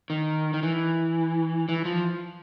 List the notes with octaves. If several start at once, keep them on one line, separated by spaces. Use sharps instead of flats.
D#3
D#3
E3
E3
F3